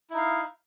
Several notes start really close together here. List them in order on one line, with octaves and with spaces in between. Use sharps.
E4 D#4 F5